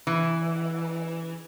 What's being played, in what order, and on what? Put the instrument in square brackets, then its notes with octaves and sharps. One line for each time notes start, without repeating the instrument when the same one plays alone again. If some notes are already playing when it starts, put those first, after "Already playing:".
[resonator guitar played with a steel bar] E3